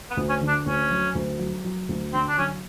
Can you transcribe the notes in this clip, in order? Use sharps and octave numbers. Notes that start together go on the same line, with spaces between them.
B3
D2
C#4
D3
D4
D2 C#4
F#3
D2
F#3
F#3
D2
D3 C4
D4
F#3 C#4